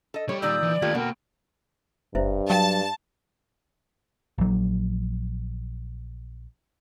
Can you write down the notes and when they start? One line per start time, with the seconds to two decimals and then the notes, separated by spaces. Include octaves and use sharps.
0.14 A4 D#5
0.29 G3 G4 C#5
0.42 A#2 D#3 D5 D#6 E6 G6
0.63 E3
0.82 D#2 A3 F4 G4 G#6
0.95 B2 A#3 A#4 F#5 G5
2.15 F#1 G2 E4 C5 E5
2.50 F#3 A4 F5 G5 A5
4.38 A#1 F#3